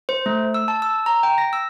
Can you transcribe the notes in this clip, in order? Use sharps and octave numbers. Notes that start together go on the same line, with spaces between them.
C5
A3
E6
A5
E6
A#5
G5
A#6
E6